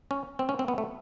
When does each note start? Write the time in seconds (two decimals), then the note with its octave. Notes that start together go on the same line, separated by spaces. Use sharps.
0.11 C#4
0.39 C4
0.49 C#4
0.59 C4
0.68 B3
0.78 A3